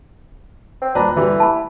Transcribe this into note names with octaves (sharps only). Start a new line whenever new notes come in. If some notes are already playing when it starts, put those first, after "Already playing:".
C4
D#1 D4 B4 A#5
D3 E3 G3
E4 A5 B5